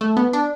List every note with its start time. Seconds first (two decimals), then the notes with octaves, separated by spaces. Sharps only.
0.01 A3
0.17 B3
0.33 D4